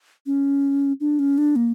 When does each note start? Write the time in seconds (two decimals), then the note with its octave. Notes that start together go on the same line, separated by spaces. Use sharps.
0.26 C#4
1.00 D4
1.19 C#4
1.38 D4
1.56 A#3